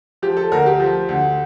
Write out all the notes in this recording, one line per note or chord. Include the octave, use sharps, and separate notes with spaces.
F3 G4
A4
D2 A#4
G4
F3
D2